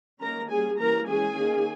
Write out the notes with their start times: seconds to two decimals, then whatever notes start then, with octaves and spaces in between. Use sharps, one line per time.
0.21 D#3 A#3 C#4 A#4 A#5
0.50 G3 A#3 C#4 G#4 G#5
0.79 E3 G3 A#3 C#4 A#4 A#5
1.07 E3 G#3 C#4 G#4 G#5
1.36 D#3 A#3 C#4